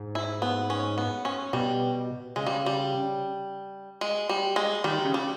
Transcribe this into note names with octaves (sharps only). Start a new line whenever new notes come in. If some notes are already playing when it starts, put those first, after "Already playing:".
Already playing: G#2
E4
B3
C#4
B3
C#4
B2 G3
C#3 G#3
G3
G3
G#3
G3
G#3
D#3 G3
C#3
G3